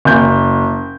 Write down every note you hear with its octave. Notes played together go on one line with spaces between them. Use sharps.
F#1 G6